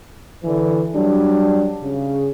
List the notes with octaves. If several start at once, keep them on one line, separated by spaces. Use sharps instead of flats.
D3 E3
F#3 G3 D4
C#3